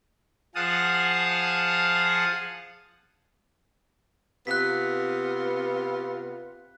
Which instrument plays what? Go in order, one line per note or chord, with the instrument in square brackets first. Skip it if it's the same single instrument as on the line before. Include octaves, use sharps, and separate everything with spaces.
[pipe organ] F3 G#4 F5 F#5 A5 D#6
[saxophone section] C3 B3 F4 [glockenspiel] F#6 B6